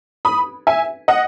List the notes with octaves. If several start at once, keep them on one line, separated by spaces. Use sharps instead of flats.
B5 D#6
E5 G#5
D#5 F#5